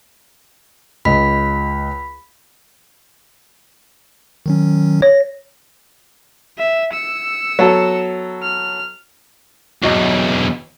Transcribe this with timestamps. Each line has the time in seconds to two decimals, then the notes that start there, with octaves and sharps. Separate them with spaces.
1.05 C#2 D#5 B5 B6
4.46 D#3 F#3 C#4
5.02 C#5 A#6
6.58 E5
6.93 E6 C#7
7.59 F#3 B3 A4
8.42 F6
9.83 B1 E2 F#4 D#5 A#5